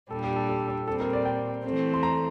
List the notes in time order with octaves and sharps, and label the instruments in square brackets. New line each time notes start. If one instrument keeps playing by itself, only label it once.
[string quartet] A#2 G3 D4 [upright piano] A4
[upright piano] G4
A4
A4
A4
[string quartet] A#2 G3 C4 [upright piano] A4
[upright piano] A#4
D5
G5
[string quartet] E3 A3 C4
[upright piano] C6
A#5